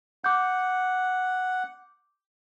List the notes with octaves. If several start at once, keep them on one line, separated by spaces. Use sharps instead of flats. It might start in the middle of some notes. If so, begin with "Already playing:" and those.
F#5 D6 G6